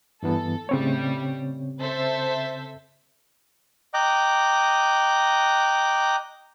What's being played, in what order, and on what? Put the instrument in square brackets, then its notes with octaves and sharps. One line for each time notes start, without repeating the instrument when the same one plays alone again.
[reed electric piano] G2 E3 B3 [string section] A4
[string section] A2 G3 [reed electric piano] C#3 C4 C#5
[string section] A4 C5 E5
[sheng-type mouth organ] D#5 G5 A#5 D6 F#6